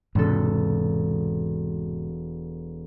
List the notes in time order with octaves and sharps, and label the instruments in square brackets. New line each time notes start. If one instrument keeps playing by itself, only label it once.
[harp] E1 A4 [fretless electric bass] G#2 C3